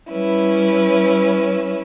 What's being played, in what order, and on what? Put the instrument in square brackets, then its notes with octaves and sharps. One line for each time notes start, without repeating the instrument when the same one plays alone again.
[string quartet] G3 C#4 E4 B4